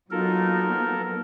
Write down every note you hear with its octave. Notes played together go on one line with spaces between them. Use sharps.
F#3 A#3 B3 D#4 F4 F#4 A4 A#4